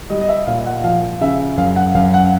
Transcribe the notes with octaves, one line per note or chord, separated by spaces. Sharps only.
G3 D#5
D#5
E5
A#2 F5
F#5
F3 F5
C#3 E5
F#2 F5
F#5
F#2 F5
F#5